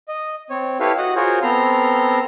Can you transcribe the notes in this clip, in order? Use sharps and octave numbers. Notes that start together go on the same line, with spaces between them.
D#5
C4 C#5
E4 G4 A4 B4 C#5 F5
F#4 D#5 F#5
F4 F#4 G#4 A#4 C5 C#5
B3 C4 A4 A#5 C6 F6